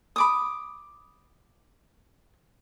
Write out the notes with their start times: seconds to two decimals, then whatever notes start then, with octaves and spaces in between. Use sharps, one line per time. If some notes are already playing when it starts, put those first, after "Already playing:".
0.16 B5 D6 D#6